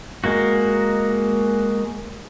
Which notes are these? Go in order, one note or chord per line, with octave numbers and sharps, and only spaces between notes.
G#3 A#3 F#4